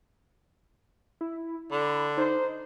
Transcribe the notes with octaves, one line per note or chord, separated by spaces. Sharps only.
E4
D3 B5
D#4 C5